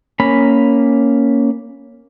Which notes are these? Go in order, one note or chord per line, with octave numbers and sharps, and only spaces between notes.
A#3 C#4 B5